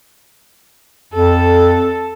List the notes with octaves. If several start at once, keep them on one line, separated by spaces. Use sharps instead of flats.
F2 A4